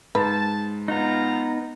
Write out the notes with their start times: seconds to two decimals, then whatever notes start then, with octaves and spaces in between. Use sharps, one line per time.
0.15 G#2 B4 A5
0.88 B3 D#4 F4 A#5